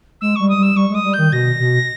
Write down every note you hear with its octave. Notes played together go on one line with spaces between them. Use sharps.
G#3 E6
G3 C#6
D#6
G3 E6
G3 C#6
G#3 D#6
G3
G6
D#3
B2 A#6
B2